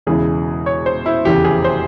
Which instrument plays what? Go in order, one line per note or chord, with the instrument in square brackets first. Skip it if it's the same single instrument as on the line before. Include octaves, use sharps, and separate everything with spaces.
[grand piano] E1 E2 C#3 E3 G#4
C#5
C5
E4
F1 E2 C#3 E3 G4
G#4
C5